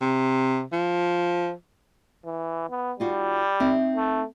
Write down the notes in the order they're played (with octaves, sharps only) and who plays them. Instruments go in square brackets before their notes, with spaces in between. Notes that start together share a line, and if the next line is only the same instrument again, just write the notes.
[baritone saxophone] C3
F3
[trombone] E3
B3
[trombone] G3 [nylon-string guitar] D#4 F4 F#4
[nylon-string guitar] C4 D#4 E5
[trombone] A3